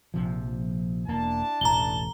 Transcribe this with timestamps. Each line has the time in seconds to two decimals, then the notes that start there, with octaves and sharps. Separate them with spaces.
0.14 A#1 C3 F3
1.08 E1 A#3 D4 E4 A5
1.61 E1 A1 A#5 G7